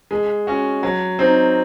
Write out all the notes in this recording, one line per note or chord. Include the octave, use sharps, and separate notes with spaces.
G#3
C#4 F#4
F#3
C4 D#4